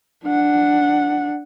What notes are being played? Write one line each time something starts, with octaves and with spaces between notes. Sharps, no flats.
D4 F#5